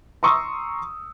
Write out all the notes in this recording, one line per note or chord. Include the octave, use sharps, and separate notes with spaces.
A#5 C6 C#6 D#6 E6